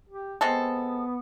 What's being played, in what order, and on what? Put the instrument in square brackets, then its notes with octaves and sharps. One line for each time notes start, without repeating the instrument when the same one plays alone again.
[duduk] G4
[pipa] G#3 C4 A4 [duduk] B3